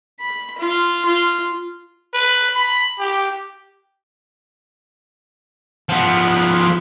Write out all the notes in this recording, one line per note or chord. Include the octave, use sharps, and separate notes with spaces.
B5
F4
F4
B4
B5
G4
F3 B3